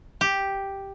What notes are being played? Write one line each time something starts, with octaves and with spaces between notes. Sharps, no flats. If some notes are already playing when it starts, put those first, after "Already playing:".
G4